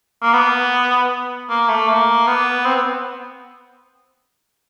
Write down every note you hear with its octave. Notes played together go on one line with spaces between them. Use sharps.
A#3
B3
A#3
A3
A#3
B3
C4
B3